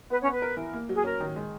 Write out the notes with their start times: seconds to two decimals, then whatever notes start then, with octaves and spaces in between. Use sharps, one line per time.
0.10 B3 B4
0.21 C#4 C#5
0.26 B3 B4
0.42 A#4
0.57 E3
0.73 A#3
0.89 F#3 G#4
1.04 C#4 A#4
1.20 D#3
1.36 G#3